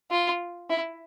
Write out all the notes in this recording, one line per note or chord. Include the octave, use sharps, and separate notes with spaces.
F4
E4